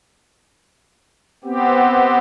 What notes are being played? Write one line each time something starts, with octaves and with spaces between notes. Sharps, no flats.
B3 C4 G4